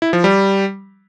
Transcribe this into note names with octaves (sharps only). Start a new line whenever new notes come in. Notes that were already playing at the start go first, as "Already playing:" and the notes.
E4
F3
G3